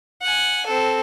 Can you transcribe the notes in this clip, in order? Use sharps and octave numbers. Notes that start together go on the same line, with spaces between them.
F#5 G#5
C4 A4